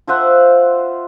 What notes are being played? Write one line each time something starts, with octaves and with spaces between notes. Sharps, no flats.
F4 C5 E5 F#5